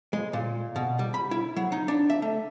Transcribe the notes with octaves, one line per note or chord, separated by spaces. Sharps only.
G#3
A#2
B2
G3
B5
E4
F#3
D#4
D4
E5
A3